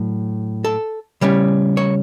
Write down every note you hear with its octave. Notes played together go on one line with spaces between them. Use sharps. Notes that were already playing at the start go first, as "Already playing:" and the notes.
Already playing: A2 F#3
A4
C#3 G3 C#4
C#5